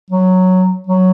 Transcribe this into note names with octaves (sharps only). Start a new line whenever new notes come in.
F#3
F#3